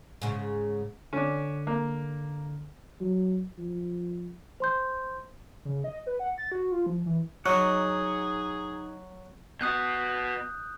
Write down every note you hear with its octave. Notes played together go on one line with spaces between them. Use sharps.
G#2 C#3
D3 C#4 D4
A#3
F#3
F3
C5 C6 G6
C#3
D#5
B4
F#5
A6
F#4
F4
F3
E3
F#3 D#4 G#4 D#5 F#5
B2 F#4 D#6 F#6 G6